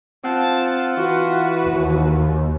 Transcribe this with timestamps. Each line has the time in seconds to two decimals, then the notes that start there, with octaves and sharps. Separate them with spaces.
0.25 C4 F4 F#5 A5
0.97 E3 F#4 B4
1.67 D#2